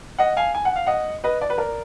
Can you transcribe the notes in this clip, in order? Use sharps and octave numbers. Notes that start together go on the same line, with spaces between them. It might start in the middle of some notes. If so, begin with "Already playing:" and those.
D#5 F#5
F5 G#5
G#5
F#5
F5
D#5 F#5
B4 D#5
D5
B4
A#4 D5